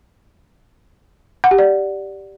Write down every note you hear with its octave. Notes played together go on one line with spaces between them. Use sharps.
F#5
G4
D5